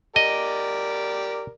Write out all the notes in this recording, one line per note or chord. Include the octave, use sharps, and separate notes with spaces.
G4 A#4 D5 D#5